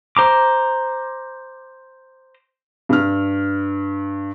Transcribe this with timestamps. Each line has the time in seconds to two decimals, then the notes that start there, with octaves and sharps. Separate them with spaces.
0.17 C5 A#5 D6
2.89 G2 F6